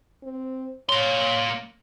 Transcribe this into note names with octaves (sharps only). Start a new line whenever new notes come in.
C4
A#3 C#5 C6